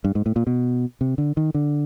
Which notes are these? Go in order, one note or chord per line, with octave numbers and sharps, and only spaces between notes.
G2
G#2
A2
A#2
B2
C3
D3
D#3
D3